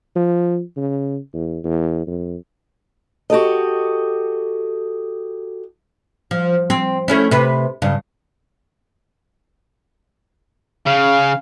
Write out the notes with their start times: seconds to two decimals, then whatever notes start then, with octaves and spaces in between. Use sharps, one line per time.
0.16 F3
0.77 C#3
1.34 E2
1.64 E2
2.07 F2
3.30 F#4 G4 A4 D#5
6.31 F3
6.70 C4
7.08 A3 C#4 E4
7.31 C3 B4
7.82 G2 C#3
10.86 C#3 F5